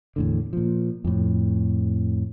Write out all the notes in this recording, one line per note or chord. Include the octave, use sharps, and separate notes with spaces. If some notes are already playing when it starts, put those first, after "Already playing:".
E2 A2 D3
A#2 F3
F2 A2